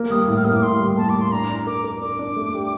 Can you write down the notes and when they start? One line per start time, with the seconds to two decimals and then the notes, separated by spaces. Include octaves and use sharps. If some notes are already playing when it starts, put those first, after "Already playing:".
Already playing: A#3
0.10 G3 D#6
0.28 A2
0.37 F6
0.45 A#3 D#6
0.56 D6
0.62 A2 C6
0.80 G3
0.97 A#3 A5
1.09 D6
1.15 A2
1.21 C6
1.32 D4 A#5
1.50 D4
1.67 A#4 D6
1.84 A#4
2.01 D4 D6
2.19 D4
2.37 A3
2.54 G4